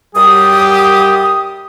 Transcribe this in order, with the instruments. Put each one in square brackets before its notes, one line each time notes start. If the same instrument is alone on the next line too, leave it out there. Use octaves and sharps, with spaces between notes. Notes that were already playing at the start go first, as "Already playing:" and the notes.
[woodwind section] F#2 G3 D#6 [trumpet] G4